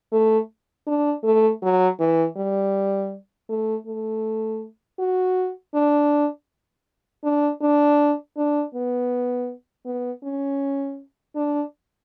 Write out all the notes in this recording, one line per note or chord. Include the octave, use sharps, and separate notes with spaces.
A3
D4
A3
F#3
E3
G3
A3
A3
F#4
D4
D4
D4
D4
B3
B3
C#4
D4